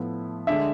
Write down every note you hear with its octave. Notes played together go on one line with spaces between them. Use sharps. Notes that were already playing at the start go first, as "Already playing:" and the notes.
Already playing: A2 F3 B3 E4
D3 G#3 D4 E5